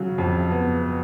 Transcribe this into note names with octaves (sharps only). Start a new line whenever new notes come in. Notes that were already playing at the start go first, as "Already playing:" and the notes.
Already playing: C#3 F#3
F2
B3